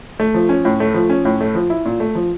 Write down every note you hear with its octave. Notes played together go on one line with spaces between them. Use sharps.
A3
F3
C#4
A2
A3
F3
C#4
A2
A3
F3
E4
A#2
A3
F3